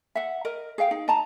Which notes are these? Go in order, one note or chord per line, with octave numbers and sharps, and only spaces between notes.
E5 F#5
A#4 D#5
G#4 D#5 F5 G5
D#4
D#5 A5 A#5